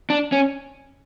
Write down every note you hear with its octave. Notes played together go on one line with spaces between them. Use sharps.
D4
C#4